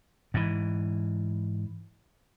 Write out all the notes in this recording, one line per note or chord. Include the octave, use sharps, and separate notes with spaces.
G#2 E3